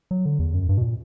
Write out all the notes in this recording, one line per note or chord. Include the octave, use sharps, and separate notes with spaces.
F#3
D3
E2
F#2
G2
B2
A#2